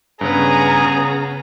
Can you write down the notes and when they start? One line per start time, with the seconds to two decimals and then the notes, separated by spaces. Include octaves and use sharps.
0.21 G2 C#3 B3 C#4 G#4 B4 A#5
0.85 C#3